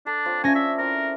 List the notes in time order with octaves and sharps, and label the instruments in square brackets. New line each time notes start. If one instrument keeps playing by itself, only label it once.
[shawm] D4 [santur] A4
[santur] C4 F4 C#5
[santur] A3 D4 C5 [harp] C#4 A#6 [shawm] G#5
[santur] D5 [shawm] E5
[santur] C4 E4 [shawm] A#4